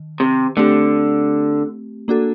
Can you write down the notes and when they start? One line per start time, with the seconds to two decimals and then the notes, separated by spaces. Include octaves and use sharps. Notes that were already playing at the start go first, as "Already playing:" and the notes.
Already playing: D#3
0.20 C3
0.57 D3 A3 C4 G4
2.08 A#3 D4 F#4 A4